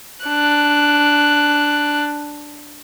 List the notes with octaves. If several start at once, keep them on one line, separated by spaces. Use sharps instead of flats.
D4 F#6